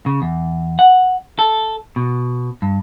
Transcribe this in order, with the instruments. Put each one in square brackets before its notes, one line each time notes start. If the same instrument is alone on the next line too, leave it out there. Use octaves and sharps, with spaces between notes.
[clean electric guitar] C#3
E2
F#5
A4
B2
G2